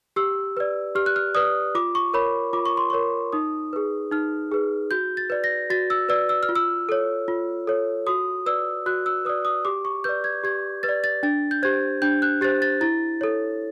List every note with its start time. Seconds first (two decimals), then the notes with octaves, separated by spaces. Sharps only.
0.16 G4 E6
0.57 B4 D5
0.95 G4 F6
1.06 F#6
1.16 F6
1.35 B4 D5 D#6
1.75 F4 D6
1.95 C#6
2.14 A#4 C#5 B5
2.53 F4 D6
2.66 C#6
2.77 C6
2.90 A#4 C#5 C#6
3.33 D#4 D#6
3.73 G#4 B4
4.12 D#4 F6
4.52 G#4 B4
4.91 F#4 G6
5.17 A6
5.30 B4 D5
5.44 A#6
5.70 F#4 A6
5.90 E6
6.09 B4 D5 E6
6.29 E6
6.43 F6
6.49 F4
6.56 E6
6.89 A4 C#5
7.28 F4
7.67 A4 C#5
8.07 F#4 D#6
8.46 B4 D5 E6
8.86 F#4 F#6
9.06 E6
9.25 B4 D5 D#6
9.45 D#6
9.65 G4 D6
9.85 C#6
10.04 B4 D5 G6
10.24 G#6
10.44 G4 G#6
10.83 B4 A6
10.89 D5
11.04 A6
11.23 D4 A6
11.51 G6
11.63 G4 C5 G#6
12.02 D4 G6
12.22 F#6
12.41 G4 C5 A6
12.62 A6
12.81 E4 A6
13.21 A4 C#5